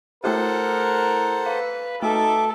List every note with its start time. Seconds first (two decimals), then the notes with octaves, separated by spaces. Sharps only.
0.24 A3 E4 G4 A4 A#4 C5 F#5
1.46 B4 F5
2.02 A3 D#4 A4 E5 D6